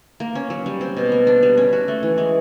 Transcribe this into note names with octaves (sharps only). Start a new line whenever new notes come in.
A#3
C#4
F#3
G3
C4
B2
A#3
D4
G3
C#4
F#4
A3
E3
G#3